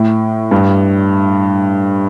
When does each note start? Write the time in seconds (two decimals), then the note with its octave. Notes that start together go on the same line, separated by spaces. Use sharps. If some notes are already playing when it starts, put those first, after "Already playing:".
Already playing: A2
0.51 G2